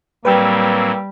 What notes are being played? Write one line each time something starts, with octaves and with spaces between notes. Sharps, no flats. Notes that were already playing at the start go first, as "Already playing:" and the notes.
A2 F#3 G3 A#3 C4 B4 G5 E6